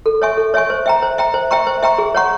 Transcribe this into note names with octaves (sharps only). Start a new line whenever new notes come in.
A4
C#5 E5 G#5 C#6
A4
C#5 E5 G#5 C#6
C5
E5 G5 A#5
C5
E5 G5 A#5
C5
E5 G5 A#5 C#6
C5
E5 G5 A#5 C#6
G#4
C#5 F#5 A#5 C#6